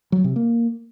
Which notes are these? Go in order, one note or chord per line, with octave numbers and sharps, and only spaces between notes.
F#3
C3
A#3